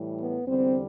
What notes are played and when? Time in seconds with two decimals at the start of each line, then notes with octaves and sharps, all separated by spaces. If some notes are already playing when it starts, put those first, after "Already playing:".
Already playing: A2 E3 G3
0.19 B3
0.47 E2 D3 G3 C4